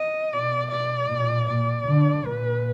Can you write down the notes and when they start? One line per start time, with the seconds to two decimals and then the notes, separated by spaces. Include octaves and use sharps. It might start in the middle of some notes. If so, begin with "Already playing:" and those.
Already playing: D#5
0.33 B2 D5
0.71 D5
1.09 A#2
1.48 A#2 D5
1.87 D3
2.25 A#2 B4